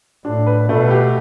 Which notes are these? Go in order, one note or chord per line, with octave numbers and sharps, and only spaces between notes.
A2 D4
B4
B2 A3
G4